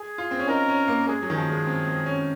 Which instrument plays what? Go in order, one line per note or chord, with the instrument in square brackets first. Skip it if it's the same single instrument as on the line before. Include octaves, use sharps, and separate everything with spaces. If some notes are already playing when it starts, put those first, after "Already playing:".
Already playing: [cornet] G#4
[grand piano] F4
C4
C#4
[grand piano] D#4 [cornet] A#4
[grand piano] C#4
A#3
[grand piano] G#3 [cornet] G#4
[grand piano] F#3
D#3
[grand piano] F3 [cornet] G#4
[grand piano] G#3
C4
C4
C#4